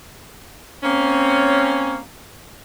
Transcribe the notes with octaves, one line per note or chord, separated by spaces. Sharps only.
A#3 C4 C#4